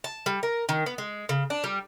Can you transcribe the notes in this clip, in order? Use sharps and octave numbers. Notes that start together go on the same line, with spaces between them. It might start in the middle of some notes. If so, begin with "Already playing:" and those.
A5
G3
A#4
D#3
B3
G#3
C#3
D4
G3